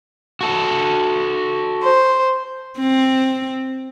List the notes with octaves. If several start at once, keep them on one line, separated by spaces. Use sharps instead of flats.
F#4 A4
C5
C4